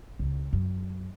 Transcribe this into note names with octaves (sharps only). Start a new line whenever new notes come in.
C#2
F#2